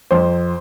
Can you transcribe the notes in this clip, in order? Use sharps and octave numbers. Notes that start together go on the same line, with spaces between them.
F2 C5